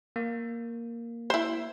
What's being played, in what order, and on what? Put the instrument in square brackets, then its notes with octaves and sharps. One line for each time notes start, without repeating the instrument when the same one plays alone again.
[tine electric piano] A#3
[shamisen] E4 C5